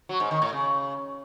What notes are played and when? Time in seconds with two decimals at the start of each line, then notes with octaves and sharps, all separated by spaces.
0.09 F#3
0.20 G#2
0.31 D#3
0.42 A2
0.53 C#3